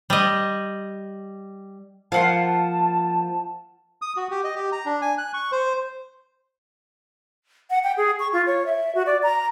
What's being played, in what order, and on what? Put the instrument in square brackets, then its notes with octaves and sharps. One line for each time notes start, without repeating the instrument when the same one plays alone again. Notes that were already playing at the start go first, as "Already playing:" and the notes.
[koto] G3 D#5
[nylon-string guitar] F3 A#3 [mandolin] F5 F#5 C6 [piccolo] A5
[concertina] D#6
F#4
G4
D#5
G4
A#5
D4
G#5
F#6
C#6
C5
[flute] F#5
G5
G#4
C#6
F4
C#5
E5
F#4
D5
A#5